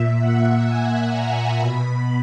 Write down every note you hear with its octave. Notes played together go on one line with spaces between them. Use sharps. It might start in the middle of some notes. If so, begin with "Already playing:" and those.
Already playing: A#2 E5
F#5
G#5
A#5
B2 B5